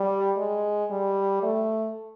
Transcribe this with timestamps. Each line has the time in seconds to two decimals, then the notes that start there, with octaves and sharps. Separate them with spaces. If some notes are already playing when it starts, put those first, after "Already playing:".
Already playing: G3
0.37 G#3
0.90 G3
1.43 A3